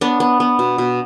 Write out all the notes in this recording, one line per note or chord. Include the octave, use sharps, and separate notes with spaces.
B3 D4
B3
B3
B2
B2